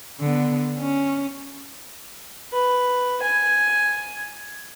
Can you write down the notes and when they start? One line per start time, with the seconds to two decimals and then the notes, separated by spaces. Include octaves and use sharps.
0.20 D3 B3
0.78 C#4
2.53 B4
3.24 G#5